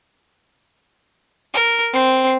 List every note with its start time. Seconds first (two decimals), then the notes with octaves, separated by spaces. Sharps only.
1.54 A#4
1.93 C4